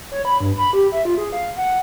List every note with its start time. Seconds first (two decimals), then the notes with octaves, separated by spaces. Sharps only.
0.11 C#5
0.25 B5
0.40 G2
0.57 B5
0.73 G4
0.92 E5
1.05 F4
1.18 G#4
1.32 F5
1.57 F#5